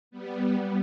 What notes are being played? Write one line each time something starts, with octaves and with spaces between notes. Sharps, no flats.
G3 B3